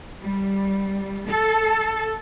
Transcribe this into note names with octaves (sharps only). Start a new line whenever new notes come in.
G3
A4